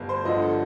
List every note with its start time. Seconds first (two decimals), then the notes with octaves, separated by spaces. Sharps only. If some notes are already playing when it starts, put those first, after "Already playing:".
Already playing: G1
0.09 C5
0.25 G2 D3 F3 D#5
0.42 A4